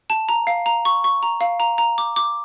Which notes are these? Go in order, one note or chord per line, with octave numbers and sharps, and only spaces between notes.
A5
A#5
F5
A#5
C#6
C#6
A#5
F5
A#5
A#5
D6
D6